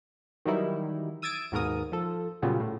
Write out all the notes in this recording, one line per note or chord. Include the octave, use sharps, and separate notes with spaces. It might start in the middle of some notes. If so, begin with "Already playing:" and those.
D#3 E3 F#3 G3 D#4 E4
D#6 E6 G#6 A6 D7 D#7
D#2 G#2 B2 A#4 D#6
F3 A4
A#2 C#3 F#3 G3 B3
A2